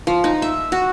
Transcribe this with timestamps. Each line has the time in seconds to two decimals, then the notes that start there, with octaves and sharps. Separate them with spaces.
0.07 F3
0.24 D#4
0.42 E5
0.72 F#4